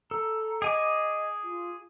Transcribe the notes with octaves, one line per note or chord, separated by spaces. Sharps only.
A4 A#5
G#4 D#5 G#5 D6
F4